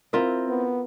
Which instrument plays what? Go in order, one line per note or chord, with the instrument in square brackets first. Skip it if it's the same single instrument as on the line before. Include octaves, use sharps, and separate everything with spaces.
[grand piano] C4 E4 [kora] F4 A#4 E5
[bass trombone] B3